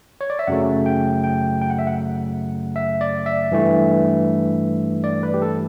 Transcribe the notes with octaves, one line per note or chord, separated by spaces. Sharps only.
C#5
D5
E5
F#2 C#3 F#3 A3 F#5
G5
G5
G5
F#5
E5
F#5
E5
D5
E5
G2 E3 A3
D5
B4
G4
A4